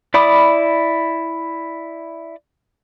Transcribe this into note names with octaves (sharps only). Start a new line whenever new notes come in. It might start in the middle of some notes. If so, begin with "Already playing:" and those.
E4 D5 B5 D6 D#6